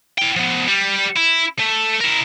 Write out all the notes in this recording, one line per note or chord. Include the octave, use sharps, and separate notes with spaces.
E4 G5
F3 B3
G3
E4
A3
E4 A#4